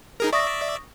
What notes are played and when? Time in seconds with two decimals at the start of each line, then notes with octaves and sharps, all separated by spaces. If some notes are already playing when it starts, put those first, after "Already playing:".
0.20 D#4 G#4 A#4
0.33 D5 E5 C#6 D#6 A#6